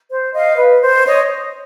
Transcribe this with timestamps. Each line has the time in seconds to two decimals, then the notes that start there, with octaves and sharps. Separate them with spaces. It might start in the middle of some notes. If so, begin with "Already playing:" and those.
0.10 C5
0.34 D#5 F5
0.58 B4
0.81 C5
1.05 C#5 D#5